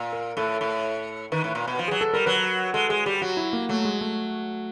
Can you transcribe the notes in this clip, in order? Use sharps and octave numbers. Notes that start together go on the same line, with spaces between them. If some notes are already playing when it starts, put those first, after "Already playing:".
Already playing: A#2
A#4
A2 A4
A2
D#3 B4
A2
A#2
B2
F3
F#3 G#4
A4
G3 A#4
F#3 B4
G#3 A4
G#3 G#4
G3 G4
F#3 F#4
E4
A#3
F#3 A3
G#3
A3